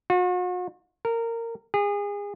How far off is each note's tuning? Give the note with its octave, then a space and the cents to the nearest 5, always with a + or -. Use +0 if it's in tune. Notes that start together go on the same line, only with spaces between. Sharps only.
F#4 -45
A#4 -20
G#4 -30